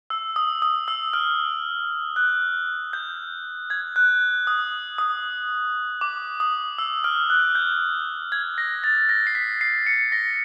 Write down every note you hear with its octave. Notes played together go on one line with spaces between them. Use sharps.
E6
D#6
D#6
E6
F6
F#6
G6
G#6
F#6
D#6
D#6
D6
D#6
E6
F6
F#6
G6
G#6
A#6
A6
A#6
C7
B6
C7
C#7
A#6